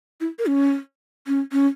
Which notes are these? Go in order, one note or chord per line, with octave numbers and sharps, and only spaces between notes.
E4
A#4
C#4
C#4
C#4